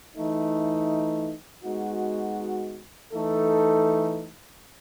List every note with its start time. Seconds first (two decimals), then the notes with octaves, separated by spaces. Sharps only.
0.16 E3 A3 D#4
1.63 G#3 B3 D#4 F#4
3.12 E3 A3 D#4 A4